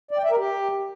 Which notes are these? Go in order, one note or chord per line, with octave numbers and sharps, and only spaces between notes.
D5
G5
E5
A#4
G4